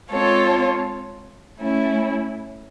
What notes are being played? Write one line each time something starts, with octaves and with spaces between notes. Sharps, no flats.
G#3 C4 F4 A4 C#5
A3 C#4 E4